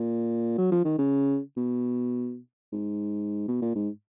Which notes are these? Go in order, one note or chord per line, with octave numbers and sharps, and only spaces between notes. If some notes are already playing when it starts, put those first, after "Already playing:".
Already playing: A#2
F#3
F3
D#3
C#3
B2
G#2
B2
A#2
G#2